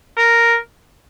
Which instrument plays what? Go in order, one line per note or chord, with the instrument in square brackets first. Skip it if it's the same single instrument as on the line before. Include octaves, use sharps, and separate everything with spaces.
[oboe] A#4